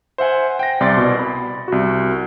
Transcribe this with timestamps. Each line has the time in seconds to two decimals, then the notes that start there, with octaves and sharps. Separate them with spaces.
0.18 C5 E5 F#5 G#5
0.59 G5 A#6
0.80 C2 D5 C6 A6
0.97 B2
1.19 B5
1.68 C2 F#4